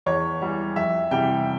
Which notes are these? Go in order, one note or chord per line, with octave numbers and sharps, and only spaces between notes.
E2 C#5
E3 G3
F2 E5
C3 E3 G3 G5